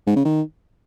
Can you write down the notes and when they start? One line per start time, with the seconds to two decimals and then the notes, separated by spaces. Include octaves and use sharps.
0.07 G#2
0.16 C#3
0.25 D#3